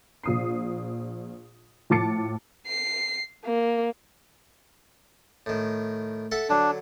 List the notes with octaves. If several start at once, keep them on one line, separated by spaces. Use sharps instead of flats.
A#1 D#6 C7
A2 F3 A5 D6 A6 C#7
C7
A#3
A2 D#3
A4 E5 F#5
D3 F#3 D4